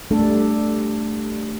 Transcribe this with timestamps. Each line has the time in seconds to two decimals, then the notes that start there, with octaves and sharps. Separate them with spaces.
0.11 G3 A3 D4 A4